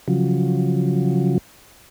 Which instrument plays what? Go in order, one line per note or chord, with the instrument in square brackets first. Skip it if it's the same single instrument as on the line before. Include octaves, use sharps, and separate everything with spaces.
[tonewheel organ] C#3 F3 F#3